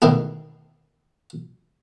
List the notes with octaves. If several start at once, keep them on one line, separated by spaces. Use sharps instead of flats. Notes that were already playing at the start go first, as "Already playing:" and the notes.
D2 B2 D#3 G#3 E4 G#4